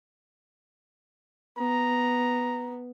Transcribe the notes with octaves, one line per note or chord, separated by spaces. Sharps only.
B3 A#5